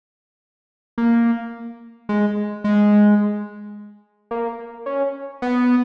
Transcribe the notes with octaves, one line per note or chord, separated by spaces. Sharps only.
A#3
G#3
G#3
A#3
C#4
B3